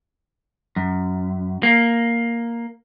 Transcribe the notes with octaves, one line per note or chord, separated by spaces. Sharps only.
F#2
A#3